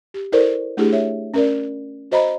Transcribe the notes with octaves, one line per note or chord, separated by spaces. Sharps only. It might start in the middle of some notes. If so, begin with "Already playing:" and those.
G4
E4 A4 A#4 C5 D5
A3 D4 E4 G4 G#4
C#5 E5
C#4 A#4 D5
F#4 C5 D#5 A#5 B5